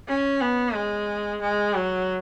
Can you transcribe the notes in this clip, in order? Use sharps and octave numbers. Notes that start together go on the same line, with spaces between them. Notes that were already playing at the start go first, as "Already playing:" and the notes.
C#4
B3
G#3
G#3
F#3